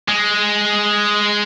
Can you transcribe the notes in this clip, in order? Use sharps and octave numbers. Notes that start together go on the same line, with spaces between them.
G#3